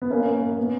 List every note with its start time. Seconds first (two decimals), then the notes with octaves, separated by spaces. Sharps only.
0.02 B3
0.11 A#3 C#4
0.26 A#3
0.42 A#3
0.58 B3